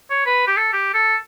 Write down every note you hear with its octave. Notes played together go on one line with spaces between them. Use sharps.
C#5
B4
G4
A4
G4
A4